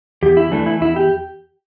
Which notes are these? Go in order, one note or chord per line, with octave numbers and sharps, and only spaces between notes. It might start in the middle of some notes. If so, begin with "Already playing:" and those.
E2 G4
E4
E3 A3 D4
E4
E2 E4
G4